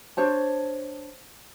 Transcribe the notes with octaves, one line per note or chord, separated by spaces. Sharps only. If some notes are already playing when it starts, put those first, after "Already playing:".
D4 C5 C#5 A5